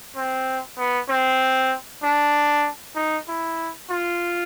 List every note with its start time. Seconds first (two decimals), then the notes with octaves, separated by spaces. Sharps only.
0.16 C4
0.78 B3
1.09 C4
2.03 D4
2.96 D#4
3.28 E4
3.90 F4